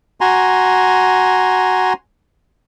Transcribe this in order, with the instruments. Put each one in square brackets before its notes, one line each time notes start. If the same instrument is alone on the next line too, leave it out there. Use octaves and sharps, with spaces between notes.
[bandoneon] F#4 G#5 A#5 C6